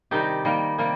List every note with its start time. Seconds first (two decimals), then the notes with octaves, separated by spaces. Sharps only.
0.11 C3 D#3 G3 D#4 G4
0.45 D#3 G3 A#3
0.78 C3 G3 A#3